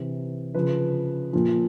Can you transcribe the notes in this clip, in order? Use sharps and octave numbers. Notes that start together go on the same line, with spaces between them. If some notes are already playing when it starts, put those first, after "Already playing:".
Already playing: C3 E3
C#3 F3 B4
A#2 F3